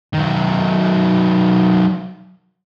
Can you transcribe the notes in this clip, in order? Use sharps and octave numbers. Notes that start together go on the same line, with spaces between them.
D#3 F#3